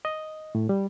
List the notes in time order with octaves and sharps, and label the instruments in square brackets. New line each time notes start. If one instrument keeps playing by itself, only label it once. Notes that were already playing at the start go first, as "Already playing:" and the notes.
[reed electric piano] D#5
A2
G3